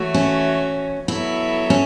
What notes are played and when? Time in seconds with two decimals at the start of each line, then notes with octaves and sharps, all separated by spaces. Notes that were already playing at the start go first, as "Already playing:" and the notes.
Already playing: E3 A3 F#4 C#5 E5
0.14 C#4
1.08 F#3 B3 E4 A4 C#5 E5
1.70 C#4